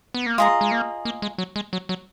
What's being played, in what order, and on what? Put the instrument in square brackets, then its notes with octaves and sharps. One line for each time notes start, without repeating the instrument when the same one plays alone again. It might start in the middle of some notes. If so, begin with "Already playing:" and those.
[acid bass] B3
A#3
[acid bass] G#3 [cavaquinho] F4 G#4 D#5 A#5
[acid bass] G#3
A#3
A#3
G#3
F#3
G#3
F#3
F#3